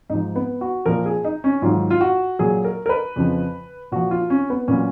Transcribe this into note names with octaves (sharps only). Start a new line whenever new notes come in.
G#2 D#4
F3
B3
F#4
A#2 F3 A#4
G#4
D#4
C#4
G#2 D#3 F#3 F4
F4
F#4
A#2 F#3 G#4
A#4
A#4
B4
F2 C#3 F3
A#2 F3 F#4
F4
C#4
B3
A#2 F#3 C#4